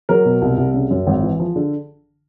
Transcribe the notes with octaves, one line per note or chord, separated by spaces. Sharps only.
F#3 A#4
B2
C2
C2
C#3
F#2
G#1
E3
F3
D3